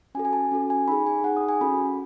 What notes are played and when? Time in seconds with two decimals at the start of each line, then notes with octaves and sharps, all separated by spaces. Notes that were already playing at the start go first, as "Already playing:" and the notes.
0.15 C#4 F#4 A4 G#5
0.25 G#5
0.33 A5
0.51 C#4 F#4 A4
0.70 G#5
0.88 D#4 G#4 B5
1.07 G#5
1.24 D#4 G#4 F#5
1.37 D#6
1.49 G#5
1.61 C#4 F#4 A4 B5